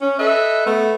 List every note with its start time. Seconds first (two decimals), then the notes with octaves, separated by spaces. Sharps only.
0.01 C#4
0.19 A4 B4 D#5 E5
0.67 A3 B3